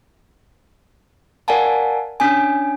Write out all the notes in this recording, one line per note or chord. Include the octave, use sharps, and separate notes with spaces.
A#4 D5 F5 F#5 G#5 A5
C#4 D4 G#5